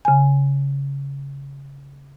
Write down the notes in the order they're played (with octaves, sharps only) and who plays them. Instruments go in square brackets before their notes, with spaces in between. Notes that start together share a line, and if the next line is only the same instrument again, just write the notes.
[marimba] C#3 G#5